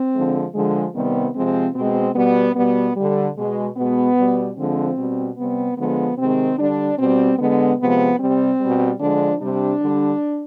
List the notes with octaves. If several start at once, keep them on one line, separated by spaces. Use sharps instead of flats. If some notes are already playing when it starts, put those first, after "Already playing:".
Already playing: C4
D3 F3 G#3
D3 F3 G#3
C3 D#3 G3 B3
C3 F3 G#3 C4
B2 G#3 C4
B2 G3 B3
B2 G3 B3
D3 G3
B2 G#3
B2 G#3 B3
B2 G3
D3 F3 G#3 C4
B2 G3
C3 G3 B3
D3 F3 G#3 B3
C3 D#3 G#3 C4
D3 G3 D4
B2 G3 C4
D3 G#3 B3
C3 F3 G#3 B3
C3 G3 C4
B2 G3
D3 F3 G#3 D4
C3 G3 D4
D3 G3